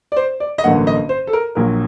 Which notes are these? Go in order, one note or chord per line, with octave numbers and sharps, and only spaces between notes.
D5
C5
D5
D#5
A1 G2 D3 F#3 A#3 F#5
D#5
C5
A4
A#4
A#1 A#2 F#3 A#4